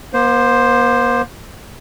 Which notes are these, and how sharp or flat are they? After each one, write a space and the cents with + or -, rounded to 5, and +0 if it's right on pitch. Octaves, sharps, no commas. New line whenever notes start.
A#3 +45 C5 +0